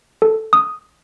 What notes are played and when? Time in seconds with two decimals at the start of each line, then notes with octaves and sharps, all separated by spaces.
0.22 A4
0.53 D#6